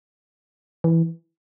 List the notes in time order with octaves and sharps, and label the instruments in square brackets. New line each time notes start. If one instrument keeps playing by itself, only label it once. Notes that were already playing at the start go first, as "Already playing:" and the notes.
[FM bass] E3